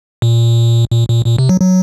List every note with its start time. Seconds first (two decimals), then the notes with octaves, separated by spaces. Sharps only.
0.22 A#2
0.92 A#2
1.09 A#2
1.26 A#2
1.38 C3
1.49 F#3
1.61 F#3